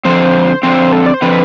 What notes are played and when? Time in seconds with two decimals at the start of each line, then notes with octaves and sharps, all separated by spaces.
0.04 D3 F3 C4 C5
0.63 D3 F3 C4 C5
0.92 A4
1.06 D5
1.14 C5
1.22 D3 F3 C4 B4